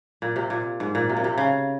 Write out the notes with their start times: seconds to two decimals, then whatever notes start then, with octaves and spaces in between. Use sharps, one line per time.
0.22 A#2
0.36 C3
0.50 A#2
0.80 G#2
0.95 A#2
1.09 C3
1.17 A#2
1.24 C3
1.38 C#3